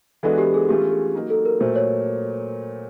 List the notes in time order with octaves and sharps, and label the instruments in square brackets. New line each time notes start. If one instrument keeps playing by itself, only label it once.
[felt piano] E3 G#3 B3 D4 F#4 [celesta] A4
[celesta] G4
G#4
[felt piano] E3 A3 C#4 F4 [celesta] G4
[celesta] G#4
[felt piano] F#3 A#3 D#4
[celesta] A4
A#4
[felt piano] A#2 F#3 A3 [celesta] C5
[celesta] C#5